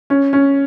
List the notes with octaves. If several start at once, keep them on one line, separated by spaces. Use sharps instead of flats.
C#4
C#4